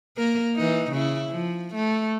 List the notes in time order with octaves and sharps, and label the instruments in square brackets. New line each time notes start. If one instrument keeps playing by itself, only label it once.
[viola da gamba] A#3 A#4
E3 D#4
C#3 E4
F3
A3